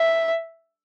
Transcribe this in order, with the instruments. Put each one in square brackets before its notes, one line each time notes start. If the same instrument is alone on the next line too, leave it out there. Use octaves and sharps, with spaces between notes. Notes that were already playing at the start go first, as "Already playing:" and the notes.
Already playing: [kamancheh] E5